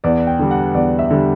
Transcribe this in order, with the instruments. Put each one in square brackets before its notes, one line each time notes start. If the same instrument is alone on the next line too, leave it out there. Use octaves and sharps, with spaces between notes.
[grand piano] E2 D5
G5
D3 G3
F#5
E2 D5
E5
D3 G3